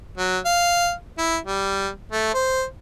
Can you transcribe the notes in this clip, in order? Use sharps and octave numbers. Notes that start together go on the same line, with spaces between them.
F#3
F5
E4
G3
A3
C5